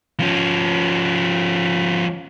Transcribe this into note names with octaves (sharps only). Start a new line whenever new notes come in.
F3 C#4